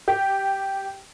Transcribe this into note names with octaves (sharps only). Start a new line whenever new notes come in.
G4